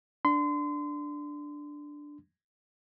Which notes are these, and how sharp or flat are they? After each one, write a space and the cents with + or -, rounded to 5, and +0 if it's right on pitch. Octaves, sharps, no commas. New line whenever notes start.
D4 +0 C6 -30